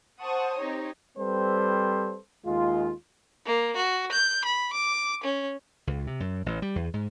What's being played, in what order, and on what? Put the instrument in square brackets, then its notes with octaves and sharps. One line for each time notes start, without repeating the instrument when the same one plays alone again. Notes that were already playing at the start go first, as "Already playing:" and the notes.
[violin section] C5 F#5 A5 C#6 D#6
C4 D#4 G4 C#5
[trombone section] G3 C4 A4 B4 C5
D#2 G#3 F4
[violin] A#3
F#4
G6
B5
D6
C#4
[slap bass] C#2
C3
F#2
A1
G3
E2
G#2